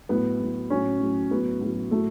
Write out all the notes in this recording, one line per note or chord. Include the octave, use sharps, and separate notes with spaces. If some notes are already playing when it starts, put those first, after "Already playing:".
A2 F#3 B3
A2 F#3
A2 F#3 C#4
A2 F#3
A2 F#3 B3
A2 F#3
A2 F#3 A3